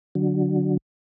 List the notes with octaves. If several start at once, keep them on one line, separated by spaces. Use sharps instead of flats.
D3 F#3